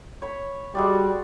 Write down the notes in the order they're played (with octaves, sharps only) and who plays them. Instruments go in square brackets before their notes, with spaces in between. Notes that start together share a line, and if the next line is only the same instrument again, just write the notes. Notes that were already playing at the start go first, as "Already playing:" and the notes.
[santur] C#5 B5
[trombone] G3 [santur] G#3 F#4 D5